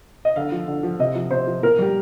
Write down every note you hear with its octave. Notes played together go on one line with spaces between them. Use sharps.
D#5
D3 F5
F3
D3
F3
C3 D#5
F3
C3 C5
F3
A#2 A#4
G3 G4